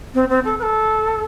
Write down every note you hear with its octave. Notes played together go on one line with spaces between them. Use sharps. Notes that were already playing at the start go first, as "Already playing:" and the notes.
C4
C4
A4
B4
A4